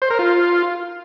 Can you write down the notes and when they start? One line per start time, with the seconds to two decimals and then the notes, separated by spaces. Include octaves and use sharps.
0.02 C5
0.10 A#4
0.19 F4